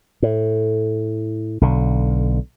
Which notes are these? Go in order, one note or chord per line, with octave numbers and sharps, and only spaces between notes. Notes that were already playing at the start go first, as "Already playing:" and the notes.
A2
B1 D3